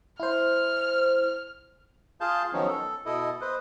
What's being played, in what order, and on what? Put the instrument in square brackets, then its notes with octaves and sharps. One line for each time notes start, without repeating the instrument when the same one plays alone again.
[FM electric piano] E4 C5 [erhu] F6
[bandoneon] F4 G#4 F5 A5 G6
D#3 F3 F#3 B3 C#4 D#4
A4
B2 E4 A4 D#5
B4 C5 D#5